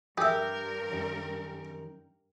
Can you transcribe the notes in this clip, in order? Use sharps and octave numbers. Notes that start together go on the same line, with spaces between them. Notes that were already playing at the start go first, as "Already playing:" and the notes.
G2 G4 G#4 A#4 E5
F#2 D#3 G3